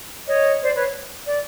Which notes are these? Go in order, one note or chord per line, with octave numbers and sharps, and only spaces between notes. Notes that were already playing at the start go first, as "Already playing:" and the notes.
C#5 D#5
C5 D5
B4 C#5
D5